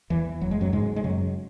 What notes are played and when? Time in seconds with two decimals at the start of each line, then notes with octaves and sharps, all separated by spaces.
0.10 E2 E3
0.41 F#1 F#3
0.51 G#3
0.61 F#2 F#3
0.73 G#2 C#3 G#3
0.96 G#3
1.04 F#2 C#3 F#3